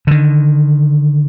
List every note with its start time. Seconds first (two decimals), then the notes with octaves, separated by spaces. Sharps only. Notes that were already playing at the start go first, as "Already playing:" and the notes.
0.07 D3 D#3